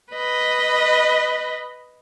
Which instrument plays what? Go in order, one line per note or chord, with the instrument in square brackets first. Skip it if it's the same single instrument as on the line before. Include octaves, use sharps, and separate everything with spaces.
[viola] B4 D#5